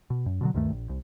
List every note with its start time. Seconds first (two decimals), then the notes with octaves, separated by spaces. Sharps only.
0.10 B2
0.26 F#2
0.41 B2 D3 F#3
0.54 D2 G2 D#3 A3
0.70 A#1
0.89 C2